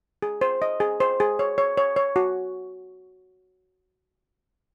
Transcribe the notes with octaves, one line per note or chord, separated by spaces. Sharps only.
G#4
C5
D#5
G#4
C5
G#4
C#5
C#5
C#5
C#5
F#4